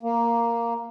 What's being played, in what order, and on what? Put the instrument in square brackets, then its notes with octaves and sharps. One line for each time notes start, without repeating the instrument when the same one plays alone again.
[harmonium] A#3